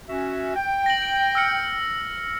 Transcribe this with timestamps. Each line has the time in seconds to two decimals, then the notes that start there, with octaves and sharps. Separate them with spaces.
0.09 C#4 F#4 E5
0.56 G5
0.86 A#6 F#7
1.35 E6 F6 C#7